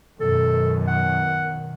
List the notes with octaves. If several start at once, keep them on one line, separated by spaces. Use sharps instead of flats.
F#2 B2 D#3 A4
F#5